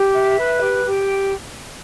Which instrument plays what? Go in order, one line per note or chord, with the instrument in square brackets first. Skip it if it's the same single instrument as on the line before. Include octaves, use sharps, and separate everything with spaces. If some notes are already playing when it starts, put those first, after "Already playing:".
Already playing: [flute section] G4
E5
B4
G4
G4